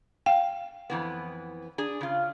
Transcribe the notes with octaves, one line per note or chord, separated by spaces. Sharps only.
F5 G5
F2 E3 B3
D4 G#4
C#3 F4